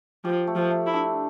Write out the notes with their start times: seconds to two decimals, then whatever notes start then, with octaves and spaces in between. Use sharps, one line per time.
0.24 F3 G4
0.47 A3
0.55 F3
0.71 A3
0.86 E4
0.94 D4